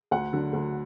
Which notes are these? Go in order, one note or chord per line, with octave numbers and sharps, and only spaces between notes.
D2 F#5
D3 F#3
D2